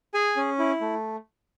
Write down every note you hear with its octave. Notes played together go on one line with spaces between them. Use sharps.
G#4 G#5
C#4
E4
A3